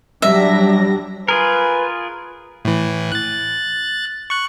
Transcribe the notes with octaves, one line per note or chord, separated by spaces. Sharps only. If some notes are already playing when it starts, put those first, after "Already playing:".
F#3 G3 D4 E5 A#6
F4 G#4 A#4 B4 G#5
A2 E3
F#6 A6
C#6 F#6